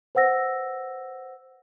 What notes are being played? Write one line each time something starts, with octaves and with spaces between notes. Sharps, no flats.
B4 C5 F#5 E6 A#6